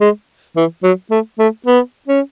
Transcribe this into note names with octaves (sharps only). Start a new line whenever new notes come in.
G#3
E3
F#3
A3
A3
B3
C#4